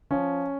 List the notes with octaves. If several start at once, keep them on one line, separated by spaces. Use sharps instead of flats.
F3 C#4